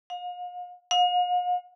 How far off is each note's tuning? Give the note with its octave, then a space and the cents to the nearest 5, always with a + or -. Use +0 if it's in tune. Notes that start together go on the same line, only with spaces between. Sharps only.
F5 +40
F5 +45